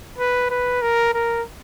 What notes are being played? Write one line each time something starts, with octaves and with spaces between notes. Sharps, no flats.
B4
B4
A#4
A#4